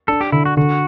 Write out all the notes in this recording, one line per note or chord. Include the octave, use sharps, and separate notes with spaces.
D4 A4
G4
D3 E4
F#4
D3 F#4